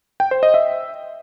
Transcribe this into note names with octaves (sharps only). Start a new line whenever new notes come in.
G5
C5
D#5
E5